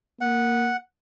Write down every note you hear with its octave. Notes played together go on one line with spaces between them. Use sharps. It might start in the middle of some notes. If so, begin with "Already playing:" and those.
A#3 F#5